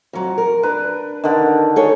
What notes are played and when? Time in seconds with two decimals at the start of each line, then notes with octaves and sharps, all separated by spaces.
0.13 F2 F#3
0.38 A#4
0.63 D4 B4
1.24 D3 D#3
1.76 G#4 A4 C#5